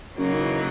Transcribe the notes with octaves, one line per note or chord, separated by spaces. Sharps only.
F#2 C#3 F#3 A#3 D#4
D#3
E3